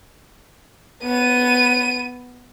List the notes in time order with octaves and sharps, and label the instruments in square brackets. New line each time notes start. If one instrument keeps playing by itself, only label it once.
[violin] B3 D#7